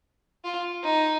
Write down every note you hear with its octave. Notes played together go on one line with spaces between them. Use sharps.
F4
D#4